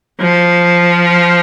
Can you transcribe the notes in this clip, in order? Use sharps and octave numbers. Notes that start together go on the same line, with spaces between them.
F3